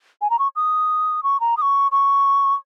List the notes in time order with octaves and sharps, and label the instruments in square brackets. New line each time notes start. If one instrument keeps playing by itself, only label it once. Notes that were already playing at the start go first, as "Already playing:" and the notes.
[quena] G#5
A#5
C#6
D#6
C#6
A#5
D#6
C#6
C#6